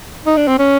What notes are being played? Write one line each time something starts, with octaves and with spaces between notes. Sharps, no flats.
D#4
D4
C4
C#4